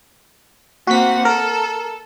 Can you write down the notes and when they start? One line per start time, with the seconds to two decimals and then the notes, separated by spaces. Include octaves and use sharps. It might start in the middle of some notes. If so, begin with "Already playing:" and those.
0.87 A#3 C4 F#4 F#5 B6
1.25 A4 A#4